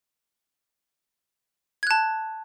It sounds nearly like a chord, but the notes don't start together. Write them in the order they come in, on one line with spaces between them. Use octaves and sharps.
G#6 F#6 A5